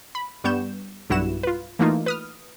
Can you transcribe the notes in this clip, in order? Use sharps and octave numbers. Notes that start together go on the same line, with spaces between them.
B5
G2 G3 B3 C#6 G6 E7
B1 G2 E4 F#4 F#5 E7
F4 B4
E3 A3 A#3 D#4 F4
B4 D#6 F6